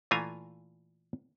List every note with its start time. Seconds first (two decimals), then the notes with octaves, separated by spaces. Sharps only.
0.11 A#2 E3 A3 F4 G#5 A#5